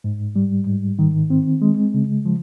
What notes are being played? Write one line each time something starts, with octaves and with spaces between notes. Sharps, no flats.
G#2
G3
G#2
D#3
C4
G#3
C#3
F3